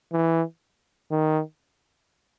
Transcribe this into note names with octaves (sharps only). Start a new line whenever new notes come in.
E3
D#3